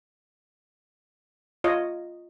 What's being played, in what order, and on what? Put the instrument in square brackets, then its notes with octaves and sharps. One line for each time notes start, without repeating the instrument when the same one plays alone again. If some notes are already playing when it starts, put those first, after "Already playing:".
[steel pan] F4 C#5 D#5